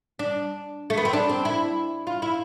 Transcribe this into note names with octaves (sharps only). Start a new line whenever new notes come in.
D4
A3
B3
C4
D4
C4
E4
F4
E4